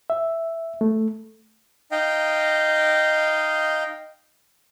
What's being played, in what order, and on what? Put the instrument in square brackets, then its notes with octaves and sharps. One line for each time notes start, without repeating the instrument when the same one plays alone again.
[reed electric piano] E5
A3
[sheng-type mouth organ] D#4 D#5 F5 G5